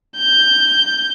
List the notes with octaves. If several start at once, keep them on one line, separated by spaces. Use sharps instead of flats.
G6